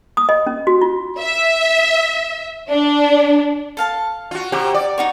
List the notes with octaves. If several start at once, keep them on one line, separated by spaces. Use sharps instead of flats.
D#6
D#5
C#4
F#4
F4
E5
D4
A4 F5 A5
F4 F#4
C3 F#4 G4 G5
D5
D#4 F#4 C#5